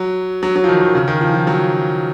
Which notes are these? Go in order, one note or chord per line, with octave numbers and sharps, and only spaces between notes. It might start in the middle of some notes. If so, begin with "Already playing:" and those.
Already playing: F#3
F#3
F#3
F3
D#3
D#3
C#3
D#3
F3
F3
F#3